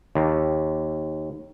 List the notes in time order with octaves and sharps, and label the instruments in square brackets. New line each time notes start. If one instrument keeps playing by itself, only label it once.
[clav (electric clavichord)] D#2